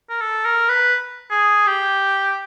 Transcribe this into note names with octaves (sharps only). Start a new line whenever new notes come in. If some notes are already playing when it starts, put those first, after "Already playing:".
A#4
A4
A#4
B4
G#4
G4